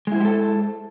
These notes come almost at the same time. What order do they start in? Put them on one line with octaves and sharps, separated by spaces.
G#3 E4 C5 G4 A4